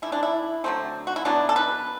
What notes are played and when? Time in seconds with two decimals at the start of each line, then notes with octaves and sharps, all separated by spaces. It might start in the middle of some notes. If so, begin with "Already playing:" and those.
0.02 D3 A3 E4
0.12 D4
0.23 E4
0.64 D3 F#3 A3 C4
1.07 F#4
1.16 E4
1.25 B2 F#3 B3 D4
1.49 A4
1.56 B4